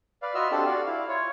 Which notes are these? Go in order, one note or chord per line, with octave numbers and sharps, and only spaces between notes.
B4 D5 F5
F4 F#4 D#5 E5 E6 F6
C4 D4 F4 G4 A4
F#4 D5 F5
E4 F5
F4 C#5